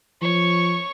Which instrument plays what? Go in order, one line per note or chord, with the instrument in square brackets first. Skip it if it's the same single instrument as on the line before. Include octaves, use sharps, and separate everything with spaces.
[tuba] F3 [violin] C#5 C#6